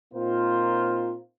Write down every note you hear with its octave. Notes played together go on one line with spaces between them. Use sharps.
A#2 C4 D#4 F4 A#4 C5